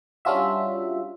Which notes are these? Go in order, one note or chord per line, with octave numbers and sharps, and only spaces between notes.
G3 C#4 D4 F4 F#4 E5